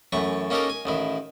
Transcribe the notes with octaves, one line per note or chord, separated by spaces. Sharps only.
F#2 E3 A3 C#6
A#3 C#4 D#4 G4 A4 A#4
G#5
A1 D#3 E4